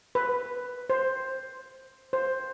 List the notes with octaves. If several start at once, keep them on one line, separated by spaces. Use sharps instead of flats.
B4
C5
C5